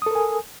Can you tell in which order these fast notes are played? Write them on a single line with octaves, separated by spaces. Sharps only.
D#6 A4 A#4 G#5